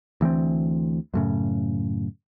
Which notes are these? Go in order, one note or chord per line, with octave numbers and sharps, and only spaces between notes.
D2 E3 A#3 C4
F#2 A2 C#3